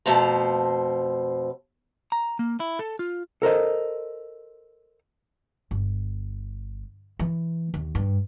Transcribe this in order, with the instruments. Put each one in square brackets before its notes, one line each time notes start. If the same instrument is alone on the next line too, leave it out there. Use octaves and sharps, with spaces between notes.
[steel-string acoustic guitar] F2 B2 A3 C5 F5 A#5
[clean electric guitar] A#5
A#3
E4
A4
F4
[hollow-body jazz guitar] A4 A#4 C5 D#5
[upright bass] G1
E3
D#2
G2